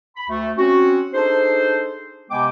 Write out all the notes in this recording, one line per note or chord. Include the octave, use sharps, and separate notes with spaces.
B5
D2 A3
C4 C#4 F#4
D4 D#4 G#4 A4 C5
C3 G#3 B3 G5 G#5 D6